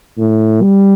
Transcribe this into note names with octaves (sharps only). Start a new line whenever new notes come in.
A2
G3